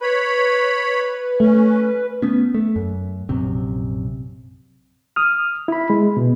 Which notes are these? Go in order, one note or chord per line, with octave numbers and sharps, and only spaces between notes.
B4 C#5 B5
A3 C#4
A3 B3 C#4
A3
F#2
A#1 F#2 C3
D#6 F6
E4 B5
G#3
B2